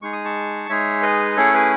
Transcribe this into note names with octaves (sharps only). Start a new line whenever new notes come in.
G#3 D#4 G#4 C#6
D#6
A5 C#6
G#3 D#4 G#4 C#5 E5
B4 D#5
A3 C#4 E4 G#4 A4 C#5
G#4 B4